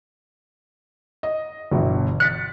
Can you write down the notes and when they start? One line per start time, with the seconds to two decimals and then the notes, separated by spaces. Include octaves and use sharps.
1.23 D#5
1.71 G1 B2 E3
2.20 F#6 A6 B6 C#7